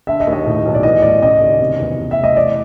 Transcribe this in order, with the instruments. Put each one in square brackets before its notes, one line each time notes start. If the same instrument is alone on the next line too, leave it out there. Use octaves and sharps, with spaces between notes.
[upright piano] D3 [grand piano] E5
[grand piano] D#5
[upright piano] D#2
[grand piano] D#5
[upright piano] A2
B1
[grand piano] D5
[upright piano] E3 [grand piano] D#5
[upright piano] A2 [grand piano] D5
[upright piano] C#3 [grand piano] D#5
[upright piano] D#2
C3
E2
E2
[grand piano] E5
[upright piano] F1
[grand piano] D#5
[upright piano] E3 [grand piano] D5